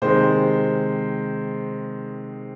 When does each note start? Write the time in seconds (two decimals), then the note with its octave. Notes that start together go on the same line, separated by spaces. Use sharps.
0.02 C3 D#3 G#3 C5